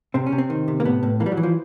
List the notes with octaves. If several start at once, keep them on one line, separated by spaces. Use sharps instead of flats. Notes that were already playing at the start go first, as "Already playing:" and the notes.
C3 C4
C#4
C3
C4
D#3
C3
A#3
A2 B3
A2
E3 A#3
G3
F#3
E3
F3